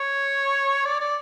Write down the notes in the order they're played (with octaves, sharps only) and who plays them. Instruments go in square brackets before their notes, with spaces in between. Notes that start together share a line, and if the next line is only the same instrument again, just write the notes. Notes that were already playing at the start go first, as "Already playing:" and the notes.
Already playing: [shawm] C#5
D5
D5